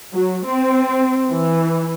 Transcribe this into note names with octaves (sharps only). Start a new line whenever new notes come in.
F#3
C4
E3